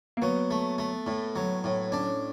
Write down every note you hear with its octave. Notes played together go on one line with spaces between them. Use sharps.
A#3
F#3 B3
A3
A3
A2
F#3
A2
C#4 D4